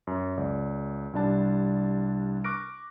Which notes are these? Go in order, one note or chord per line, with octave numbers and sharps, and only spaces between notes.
F#2
C#2 D5
C2 G3 D4 A5
C#6 D6 F6 F#6 A#6 D7